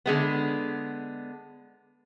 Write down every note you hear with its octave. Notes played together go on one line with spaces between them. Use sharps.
D3 G#3 B3